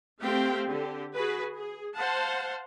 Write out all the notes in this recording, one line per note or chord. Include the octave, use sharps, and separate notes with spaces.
A3 C4 G4 F5 G5
D3 G4
F#4 G#4 B4
G#4
C5 F5 F#5 A5